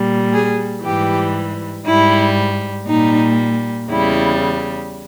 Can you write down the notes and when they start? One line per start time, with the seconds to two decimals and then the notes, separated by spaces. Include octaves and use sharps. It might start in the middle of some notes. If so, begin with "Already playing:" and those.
Already playing: A#2 G3
0.33 G#4
0.83 G#2 E3 G3 G4
1.85 G#2 G3 E4
2.87 A#2 G3 D#4
3.89 E2 C#3 G3 E4